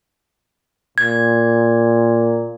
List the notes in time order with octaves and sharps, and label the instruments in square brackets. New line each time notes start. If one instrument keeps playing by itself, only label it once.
[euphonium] A#2 [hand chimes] G#6